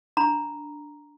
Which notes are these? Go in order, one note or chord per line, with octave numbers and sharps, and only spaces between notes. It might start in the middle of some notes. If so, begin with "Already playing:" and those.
D4 A#5 B5